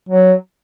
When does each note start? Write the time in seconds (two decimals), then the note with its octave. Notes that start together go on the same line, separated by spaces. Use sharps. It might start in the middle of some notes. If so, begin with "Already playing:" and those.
0.09 F#3